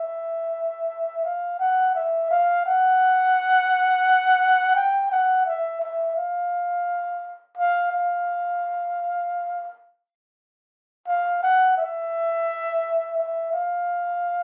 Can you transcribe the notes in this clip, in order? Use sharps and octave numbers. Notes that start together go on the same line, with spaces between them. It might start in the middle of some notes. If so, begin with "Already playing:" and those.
Already playing: E5
F5
F#5
E5
F5
F#5
G5
F#5
E5
E5
F5
F5
F5
F5
F#5
E5
E5
F5